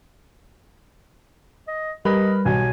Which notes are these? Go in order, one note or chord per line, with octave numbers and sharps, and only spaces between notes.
D#5
G3 A#4 B4 D#5 B5
B1 G#5